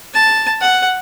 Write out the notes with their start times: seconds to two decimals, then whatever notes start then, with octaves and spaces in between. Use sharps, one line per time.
0.14 A5
0.61 F#5